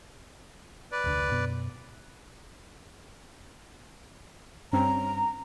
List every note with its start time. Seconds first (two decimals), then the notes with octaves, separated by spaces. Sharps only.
0.92 B4 D5
1.04 F1 D2 D3
1.31 F#2 B2 B3
4.73 G2 C4 C#4 A#5